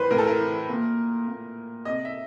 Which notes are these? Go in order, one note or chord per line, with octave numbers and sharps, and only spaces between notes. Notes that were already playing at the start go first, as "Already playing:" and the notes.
Already playing: A2 E3 B4 C5
A2 A#4
A4
A#4
E3
A#2
A#2
C3 D#5
E5